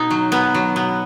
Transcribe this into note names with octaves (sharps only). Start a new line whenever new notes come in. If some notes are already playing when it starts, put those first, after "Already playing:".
Already playing: B2 D#4
F#3
B2 B3
F#3
B2 B3